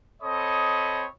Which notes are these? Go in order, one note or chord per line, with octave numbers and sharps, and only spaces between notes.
C4 A4 C#5 D#5 B5 D#6